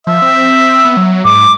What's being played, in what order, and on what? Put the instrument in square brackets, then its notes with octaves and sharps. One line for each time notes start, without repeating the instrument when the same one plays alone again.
[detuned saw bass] F3 [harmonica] E5
[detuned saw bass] C4
B3
F#3
[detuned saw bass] G#2 [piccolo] D6